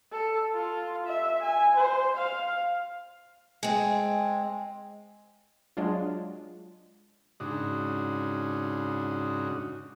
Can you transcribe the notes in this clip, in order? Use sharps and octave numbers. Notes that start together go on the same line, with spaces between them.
A4
F4
E5
G#5
C5
F5
G#3 C4
F#3 G#3 D4 F4
G#2 C#3 D4 D#4 F#4